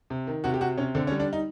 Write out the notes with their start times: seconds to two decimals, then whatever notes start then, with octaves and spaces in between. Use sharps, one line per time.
0.10 C3
0.27 D#3
0.44 C3 F#4
0.54 G4
0.61 C3 F#4
0.77 C3 C#4
0.95 D3 C4
1.07 C#4
1.11 G3
1.20 D4
1.33 D#4